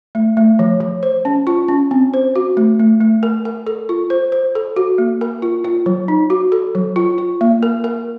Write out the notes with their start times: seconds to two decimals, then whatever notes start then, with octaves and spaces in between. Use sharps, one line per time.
0.15 A3
0.37 A3
0.59 F3
0.80 F3
1.03 C5
1.25 C#4
1.47 F4
1.68 C#4
1.91 C4
2.14 C5
2.36 F#4
2.57 A3
2.80 A3
3.01 A3
3.23 A#4
3.45 A#4
3.67 A4
3.89 F4
4.10 C5
4.32 C5
4.55 A4
4.76 F#4
4.98 A#3
5.21 A#4
5.42 F4
5.64 F4
5.86 F#3
6.08 D#4
6.30 F#4
6.52 A4
6.75 F#3
6.96 F4
7.18 F4
7.41 A#3
7.63 A#4
7.84 A#4